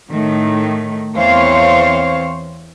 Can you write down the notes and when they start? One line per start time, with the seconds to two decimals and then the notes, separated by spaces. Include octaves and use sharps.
0.10 A2 D#3 A3
1.17 E2 E3 C4 C5 C#5 F5